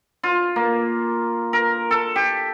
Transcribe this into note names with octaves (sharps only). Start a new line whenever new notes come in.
F4
A#3
A#4
A4
G4